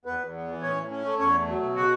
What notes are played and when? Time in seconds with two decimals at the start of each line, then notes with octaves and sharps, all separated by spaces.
0.05 E2 B3 B4
0.19 E2
0.34 B3
0.48 E3
0.62 A2 C#4 C#5
0.76 A2
0.90 C#4
1.05 A3
1.19 E2 C#4 C#5
1.33 A3
1.48 F#3
1.62 B2
1.75 C#3 F#4 F#5